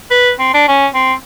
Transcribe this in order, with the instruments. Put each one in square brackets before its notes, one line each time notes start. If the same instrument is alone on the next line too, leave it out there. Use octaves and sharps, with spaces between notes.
[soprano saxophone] B4
C4
D4
C#4
C4